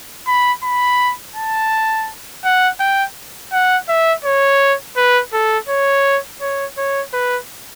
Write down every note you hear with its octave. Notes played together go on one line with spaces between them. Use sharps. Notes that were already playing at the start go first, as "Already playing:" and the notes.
B5
B5
A5
F#5
G5
F#5
E5
C#5
B4
A4
C#5
C#5
C#5
B4